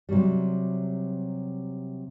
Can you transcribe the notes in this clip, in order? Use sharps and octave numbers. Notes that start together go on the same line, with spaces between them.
C3 F#3 G3